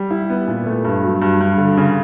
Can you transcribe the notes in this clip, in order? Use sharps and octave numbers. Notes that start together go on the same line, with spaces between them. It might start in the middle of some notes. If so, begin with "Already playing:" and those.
Already playing: G3
E4
B3
A#2
A3
G2
F#3
G2
G2
D3
C#3